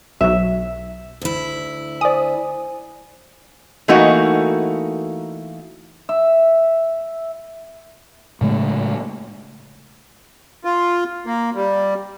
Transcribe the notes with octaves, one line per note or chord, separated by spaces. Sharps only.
B1 F#3 E5
D2 E4
C5 D5 G#5 D#6
E3 A3 A#3 D#4 F#4
E5
A2 C#3 G#3 A3
F4
A#3
G3